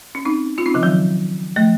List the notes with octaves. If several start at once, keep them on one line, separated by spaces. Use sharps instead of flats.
C#4
C4 D#4
C#4 F4
C4 D#4
C#3 F3
D#3 F#3
F3 A3